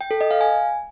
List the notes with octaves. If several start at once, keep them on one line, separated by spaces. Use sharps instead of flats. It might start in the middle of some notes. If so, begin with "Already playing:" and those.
G5
A4
D#5
F5
G#5